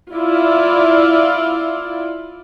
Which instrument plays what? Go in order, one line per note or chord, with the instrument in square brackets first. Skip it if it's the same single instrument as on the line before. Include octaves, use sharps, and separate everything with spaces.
[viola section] E4 F4 D5